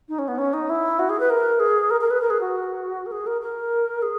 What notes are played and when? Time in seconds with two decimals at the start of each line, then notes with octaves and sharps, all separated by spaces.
0.09 D#4
0.19 C#4
0.28 B3
0.38 C#4
0.53 D#4
0.70 E4
0.99 F#4
1.09 G#4
1.20 B4
1.30 A#4
1.60 G#4
1.90 A#4
2.01 A#4
2.11 B4
2.21 A#4
2.30 G#4
2.41 F#4
3.06 A#4
3.12 G#4
3.27 A#4
3.42 A#4
4.02 G#4